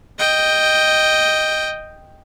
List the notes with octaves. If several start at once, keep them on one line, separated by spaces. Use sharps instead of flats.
D#5 G5